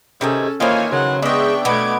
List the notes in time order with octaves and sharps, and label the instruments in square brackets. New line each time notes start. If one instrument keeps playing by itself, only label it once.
[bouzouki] C3 D#3 G#4 [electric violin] C#4 A4
[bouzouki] D#3 E3 [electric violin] A#3 [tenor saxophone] F4 [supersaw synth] C5 C#5 G#5
[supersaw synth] C#3 [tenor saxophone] F#3 [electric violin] F#5 C6
[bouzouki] G#3 D#5 [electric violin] B3 C#6 [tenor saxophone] D4 [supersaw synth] E5 G5
[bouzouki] B2 B3 [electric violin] A3 D6 [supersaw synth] G#6 D7